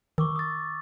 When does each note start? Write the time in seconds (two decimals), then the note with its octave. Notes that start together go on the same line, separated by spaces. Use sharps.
0.18 D#3 C#6 D6 E6
0.36 D#6 A6